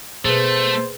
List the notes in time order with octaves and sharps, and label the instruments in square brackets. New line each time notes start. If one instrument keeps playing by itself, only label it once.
[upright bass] B2 [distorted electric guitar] A3 [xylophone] G#4 B4 [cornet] C5